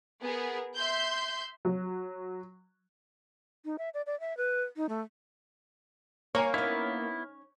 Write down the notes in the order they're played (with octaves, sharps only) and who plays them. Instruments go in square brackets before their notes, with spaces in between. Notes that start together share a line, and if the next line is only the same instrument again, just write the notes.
[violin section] B3 G#4 A#4
E5 C6 G6
[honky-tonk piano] F#3
[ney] D#4
E5
D5
D5
E5
B4
D#4
A3
[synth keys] A#3 [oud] C#5 [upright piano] G#5 A#5 C#6
[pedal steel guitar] B3 E4 [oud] C#4 D#4 [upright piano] F6